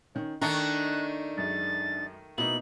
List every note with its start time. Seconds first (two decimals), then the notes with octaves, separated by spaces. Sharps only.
0.15 D#3 C#4
0.41 D#3 A3 D4 D#4 A#5 C#6 F#6
1.37 F#2 G#3 A6
2.38 B2 A#3 D#4 E4 F#7